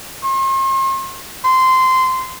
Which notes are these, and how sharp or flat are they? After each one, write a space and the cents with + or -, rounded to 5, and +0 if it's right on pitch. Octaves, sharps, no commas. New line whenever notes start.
C6 +45
C6 -15